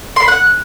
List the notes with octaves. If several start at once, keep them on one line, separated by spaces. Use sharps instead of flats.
C6
B5
F#5